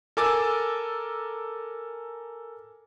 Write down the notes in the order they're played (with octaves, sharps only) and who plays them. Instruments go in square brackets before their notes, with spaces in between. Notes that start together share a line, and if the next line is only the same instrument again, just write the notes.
[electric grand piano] A4 A#4 G#5 D6 E6 A6